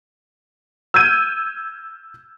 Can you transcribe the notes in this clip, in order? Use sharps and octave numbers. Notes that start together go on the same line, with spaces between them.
E6 F6 G6 G#6 D#7